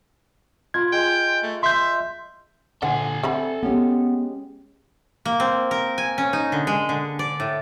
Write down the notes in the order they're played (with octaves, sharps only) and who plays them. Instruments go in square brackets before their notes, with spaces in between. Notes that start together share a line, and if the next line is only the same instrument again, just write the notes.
[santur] F4 B5 [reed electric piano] G#6
[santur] G#3 [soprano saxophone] G5
[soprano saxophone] A3
[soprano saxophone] E5 [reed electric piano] C6 G6
[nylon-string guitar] A#2 D3 [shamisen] E3 C5 F#5 [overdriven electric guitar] A4 G#5
[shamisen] D3 A3 B5 [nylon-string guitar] C4
[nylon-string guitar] G#3 C#4 G4 [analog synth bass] B3
[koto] A#3
C4
A#4
G#5
C#4
D#4
D3
G#3
D3
D5
A2